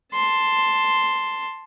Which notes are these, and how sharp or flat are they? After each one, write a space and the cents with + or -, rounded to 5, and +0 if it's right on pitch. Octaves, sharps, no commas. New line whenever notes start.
A5 +5 C6 +0